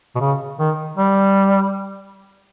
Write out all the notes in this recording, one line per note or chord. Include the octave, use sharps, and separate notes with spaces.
B2
C#3
D#3
G3